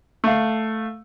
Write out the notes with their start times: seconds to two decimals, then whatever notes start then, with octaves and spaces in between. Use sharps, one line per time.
0.24 A3 F5